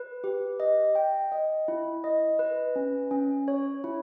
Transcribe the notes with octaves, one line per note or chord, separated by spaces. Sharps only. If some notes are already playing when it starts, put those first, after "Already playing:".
Already playing: B4
G4
D#5
G5
D#5
E4
D#5
B4
C#4
C#4
C#5
E4